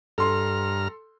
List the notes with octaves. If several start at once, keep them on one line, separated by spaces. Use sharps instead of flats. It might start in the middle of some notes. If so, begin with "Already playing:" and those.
G2 A4 A#5 C6 F6